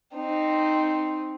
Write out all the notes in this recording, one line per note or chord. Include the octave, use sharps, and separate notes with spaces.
C4 D#4